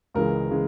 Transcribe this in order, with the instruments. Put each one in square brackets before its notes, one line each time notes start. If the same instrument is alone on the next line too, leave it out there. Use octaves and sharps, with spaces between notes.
[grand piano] C#2 C#3 E3 G#3 A#4
C#3 E3 G#3